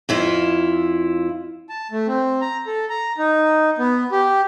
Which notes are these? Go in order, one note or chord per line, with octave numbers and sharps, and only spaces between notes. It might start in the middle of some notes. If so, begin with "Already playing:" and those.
F2 E4 F4
A5
A3
C4
A#5
A4
A#5
D#4
B3
G4